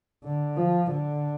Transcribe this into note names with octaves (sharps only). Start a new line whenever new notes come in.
D3
F3
D3